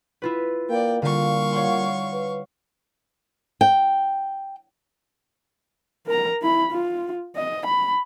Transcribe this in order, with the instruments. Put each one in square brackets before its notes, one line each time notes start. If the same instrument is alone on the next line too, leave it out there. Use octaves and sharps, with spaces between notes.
[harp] E4 F4 B4
[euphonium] A#3 [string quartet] D5 G5
[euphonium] A#2 [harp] D3 [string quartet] G3 F5 C#6
[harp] C#5 F#5 C6
[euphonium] B4
[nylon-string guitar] G5
[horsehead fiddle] A#4 A#5
E4 B5
F4
D#5
B5